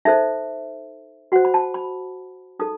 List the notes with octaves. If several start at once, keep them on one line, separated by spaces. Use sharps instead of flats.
D#4 A4 C5 E5
F#4 C5 F#5
B5
A5
B5
D#4 A4 D#6